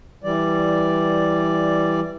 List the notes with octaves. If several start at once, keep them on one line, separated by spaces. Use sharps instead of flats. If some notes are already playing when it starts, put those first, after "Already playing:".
E3 G3 D5